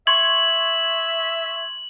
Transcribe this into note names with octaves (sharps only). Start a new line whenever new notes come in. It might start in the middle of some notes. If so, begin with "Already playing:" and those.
E5 C6 C#6 G#6 F#7